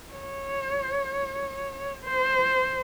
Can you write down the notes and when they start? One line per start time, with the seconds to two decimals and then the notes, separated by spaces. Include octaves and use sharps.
0.13 C#5
2.04 C5